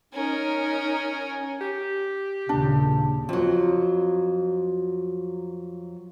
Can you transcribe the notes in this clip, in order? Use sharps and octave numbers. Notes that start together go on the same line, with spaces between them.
C#4 D#4 A#4
G4
D#2 A#2 C#3 D4
F2 F#3